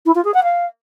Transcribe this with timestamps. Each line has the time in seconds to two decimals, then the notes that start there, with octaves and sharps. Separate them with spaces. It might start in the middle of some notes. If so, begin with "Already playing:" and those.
0.06 E4
0.15 F4
0.24 G#4
0.34 F#5
0.43 F5